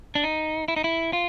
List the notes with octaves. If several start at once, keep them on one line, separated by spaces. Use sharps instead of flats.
D4
D#4
E4
D#4
E4
F4